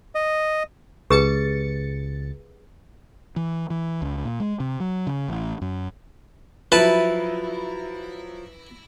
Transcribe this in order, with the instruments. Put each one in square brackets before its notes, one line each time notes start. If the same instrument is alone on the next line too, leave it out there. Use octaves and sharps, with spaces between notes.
[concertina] D#5
[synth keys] C#2 A6 C#7 [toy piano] G4 G#4 B4
[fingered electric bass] E3
E3
C#2
A#2
G#3
C3
F#3
C#3
A1
F#2
[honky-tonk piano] F3 F#3 [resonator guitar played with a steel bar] E4 [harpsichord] B4 A5